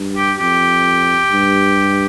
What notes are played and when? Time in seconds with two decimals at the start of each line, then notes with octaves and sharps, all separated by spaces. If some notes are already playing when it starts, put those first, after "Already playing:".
Already playing: G2
0.16 G4
0.39 F2 G4
1.32 G2